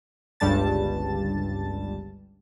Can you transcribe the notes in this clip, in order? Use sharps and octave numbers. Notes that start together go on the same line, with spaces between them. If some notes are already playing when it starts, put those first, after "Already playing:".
G1 C#2 G2 G3 A5 A6